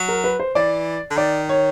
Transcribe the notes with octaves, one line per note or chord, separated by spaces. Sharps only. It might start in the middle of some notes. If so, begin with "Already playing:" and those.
Already playing: F#3
A#4
B4
C5
E3 D5
D3
D#3 D5
C#5